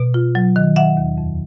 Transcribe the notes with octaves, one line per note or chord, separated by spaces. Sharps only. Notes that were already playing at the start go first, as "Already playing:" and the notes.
Already playing: B2
F4
F#3
D#3
D#3 E5 F#5
D#2
F2